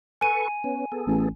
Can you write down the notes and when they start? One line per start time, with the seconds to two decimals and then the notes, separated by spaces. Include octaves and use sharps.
0.21 A4 B4 G#5 C#6 D#7
0.64 B3 C#4
0.92 B3 G#4 A4
1.07 A1